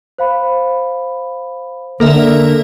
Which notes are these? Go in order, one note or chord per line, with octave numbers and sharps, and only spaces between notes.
C5 F5 B5
D3 A#3 A4 A#4 E5